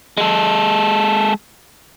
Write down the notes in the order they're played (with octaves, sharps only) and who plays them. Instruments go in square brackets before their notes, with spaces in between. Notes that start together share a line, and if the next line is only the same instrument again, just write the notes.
[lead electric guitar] G#3 A4